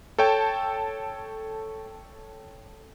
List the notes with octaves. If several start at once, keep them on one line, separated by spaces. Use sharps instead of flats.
A4 C#5 G5 A5